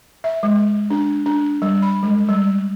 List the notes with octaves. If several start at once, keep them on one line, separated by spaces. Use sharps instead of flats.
E5
G#3
D4
D4
G3
B5
G#3
G3